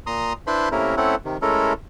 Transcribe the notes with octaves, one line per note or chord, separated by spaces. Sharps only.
A#2 A#5 C6 D#6
D4 E4 B4 C5 B5 C6
C3 A3 A#3 C#4 E4 A#4
A3 C4 C#4 E4 A4 F#5
C3 D#3
G#3 A3 C#4 E4 A4 A#4